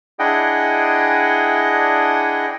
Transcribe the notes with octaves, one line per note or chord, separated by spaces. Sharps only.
D4 E4 G#4 D#5 F#5 G5